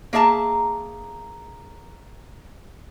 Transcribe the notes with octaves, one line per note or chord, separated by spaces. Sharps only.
A#3 G#4 E5 A5 A#5